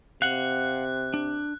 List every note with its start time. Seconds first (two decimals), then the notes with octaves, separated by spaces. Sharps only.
0.22 C3 F5 F#5 F#6
1.14 D4